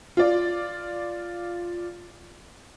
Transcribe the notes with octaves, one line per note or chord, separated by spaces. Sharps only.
F4 D5